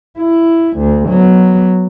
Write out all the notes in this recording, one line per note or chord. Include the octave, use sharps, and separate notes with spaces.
E4
D2
F#3 B3